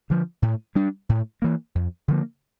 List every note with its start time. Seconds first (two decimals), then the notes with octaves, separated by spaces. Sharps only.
0.10 D3 F3
0.42 A2
0.75 G3 D4
1.09 A2
1.42 E3 A#3
1.75 F2
2.08 D3 F3 A#3